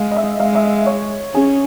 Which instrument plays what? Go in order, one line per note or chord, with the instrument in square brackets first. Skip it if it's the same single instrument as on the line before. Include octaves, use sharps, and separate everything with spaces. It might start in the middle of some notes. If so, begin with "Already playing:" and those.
Already playing: [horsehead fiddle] G#3 [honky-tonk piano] F5
[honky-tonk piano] D#5
E5
[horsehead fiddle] G#3 [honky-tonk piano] F5
[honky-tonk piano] E5
C#5
[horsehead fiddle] C#4 [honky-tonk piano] G#4